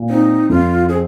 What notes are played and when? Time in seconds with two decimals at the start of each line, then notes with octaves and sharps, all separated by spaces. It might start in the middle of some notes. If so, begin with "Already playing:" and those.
Already playing: A#2
0.09 C4 D#4
0.49 F2 F4
0.89 C4 G#4